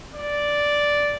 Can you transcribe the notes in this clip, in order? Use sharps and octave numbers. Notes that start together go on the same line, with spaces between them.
D5